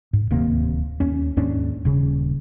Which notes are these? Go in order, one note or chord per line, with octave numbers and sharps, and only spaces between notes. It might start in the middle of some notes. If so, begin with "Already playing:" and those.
G#2
D1 D#2 C3 A#3
D#2 C#4
D#2 G#2 C#4 D4
D#1 C#3